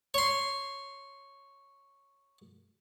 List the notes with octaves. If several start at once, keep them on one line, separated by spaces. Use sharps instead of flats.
C#5 C6